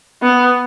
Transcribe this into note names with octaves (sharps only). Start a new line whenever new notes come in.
B3